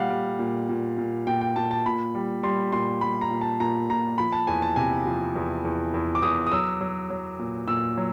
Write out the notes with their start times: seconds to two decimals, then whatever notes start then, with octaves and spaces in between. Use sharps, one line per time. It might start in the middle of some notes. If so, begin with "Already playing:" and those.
Already playing: A#2 G3 F5 F#5
0.10 G3
0.39 A#2
0.69 A#2
0.98 A#2
1.27 A#2 G5
1.41 G5
1.56 A#2 A5
1.71 A5
1.86 A#2 B5
2.15 G3
2.43 G3 C6
2.72 A#2 C6
3.01 G3 B5
3.21 A#5
3.31 A#2
3.41 A5
3.60 A#2 A#5
3.90 A#2 A#5
4.18 F3 B5
4.32 A5
4.47 E2 G#5
4.62 A5
4.76 C3 G#5
5.06 F3
5.36 E2
5.65 E2
5.94 E2
6.15 D6
6.22 E2 D#6
6.47 D#6
6.52 F#3 E6
6.81 F#3
7.10 F#3
7.39 A#2
7.68 A#2 E6
7.97 F#3